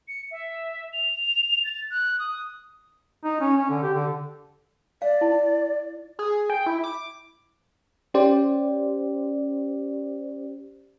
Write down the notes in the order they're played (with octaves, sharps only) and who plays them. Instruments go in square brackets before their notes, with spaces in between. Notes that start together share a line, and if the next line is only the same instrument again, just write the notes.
[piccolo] C#7
E5
F7
A6
F#6
D#6
[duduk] D#4
C#4
C#4
D3
G4
D3
[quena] D5 [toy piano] F5
[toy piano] E4
[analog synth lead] G#4
G5
E4
D6
[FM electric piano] C#4 G4 C5 D5